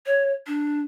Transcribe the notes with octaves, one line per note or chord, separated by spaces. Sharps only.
C#5
D4